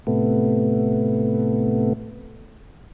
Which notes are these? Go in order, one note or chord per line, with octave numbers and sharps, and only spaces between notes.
A2 C3 A3 B3